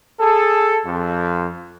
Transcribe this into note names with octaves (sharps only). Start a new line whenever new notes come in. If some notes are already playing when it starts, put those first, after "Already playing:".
G#4 A4
F2